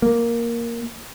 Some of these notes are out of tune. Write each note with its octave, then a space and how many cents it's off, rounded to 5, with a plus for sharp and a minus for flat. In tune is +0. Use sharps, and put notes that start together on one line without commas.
A#3 +5